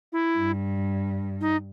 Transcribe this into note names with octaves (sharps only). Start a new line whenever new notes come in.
E4
G2
D#4